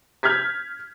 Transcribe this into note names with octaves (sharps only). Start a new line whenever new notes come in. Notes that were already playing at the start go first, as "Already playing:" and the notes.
F6 G6 G#6 B6